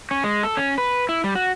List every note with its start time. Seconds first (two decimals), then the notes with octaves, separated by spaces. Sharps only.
0.11 C#4
0.24 G#3
0.43 A4
0.57 C#4
0.78 B4
1.09 E4
1.24 G3
1.35 F#4